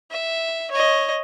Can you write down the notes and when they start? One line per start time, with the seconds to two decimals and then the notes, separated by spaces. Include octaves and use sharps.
0.11 E5
0.71 C#5 D#5